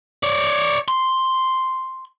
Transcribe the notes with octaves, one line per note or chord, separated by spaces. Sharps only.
C#5 D5
C6